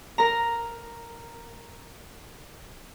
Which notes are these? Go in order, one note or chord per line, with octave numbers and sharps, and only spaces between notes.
A#4 A#5